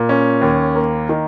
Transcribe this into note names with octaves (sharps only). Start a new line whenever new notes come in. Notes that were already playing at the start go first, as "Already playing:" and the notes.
Already playing: A#2
C#4
D#2
A#3
D#3